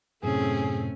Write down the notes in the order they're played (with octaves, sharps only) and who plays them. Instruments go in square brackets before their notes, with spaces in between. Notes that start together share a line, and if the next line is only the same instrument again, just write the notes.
[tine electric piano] F#2 A2 C3 [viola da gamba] A3 C4 C#4 [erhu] G#4